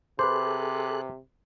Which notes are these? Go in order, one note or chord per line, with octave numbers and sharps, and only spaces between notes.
C3 G#4 A4 B4 C5 D6 F#6